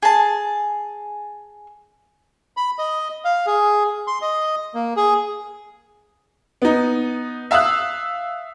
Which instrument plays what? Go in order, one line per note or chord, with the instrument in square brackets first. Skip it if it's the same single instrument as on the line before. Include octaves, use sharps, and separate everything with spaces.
[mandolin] G#4 A5
[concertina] B5
D#5
F5
G#4
C6
D#5
A#3
G#4
[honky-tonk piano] B3 D#4
E5 F5 D#6 E6 F#6